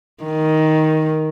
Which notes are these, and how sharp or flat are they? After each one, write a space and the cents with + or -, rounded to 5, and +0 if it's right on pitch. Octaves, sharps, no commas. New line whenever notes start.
D#3 +10